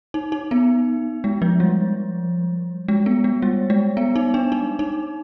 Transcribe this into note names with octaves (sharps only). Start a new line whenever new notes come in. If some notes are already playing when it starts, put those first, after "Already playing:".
D#4
D#4
B3
G#3
F3
G3
G#3
B3
G#3
G3
G#3
B3
D#4
D4
D#4
D#4